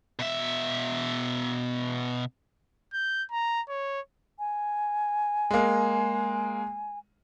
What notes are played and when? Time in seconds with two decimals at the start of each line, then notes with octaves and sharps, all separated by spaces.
0.19 B2 E5
2.93 G6
3.31 A#5
3.69 C#5
4.39 G#5
5.51 G#3 A#3